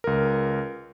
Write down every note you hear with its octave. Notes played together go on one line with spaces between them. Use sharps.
C#2 A#4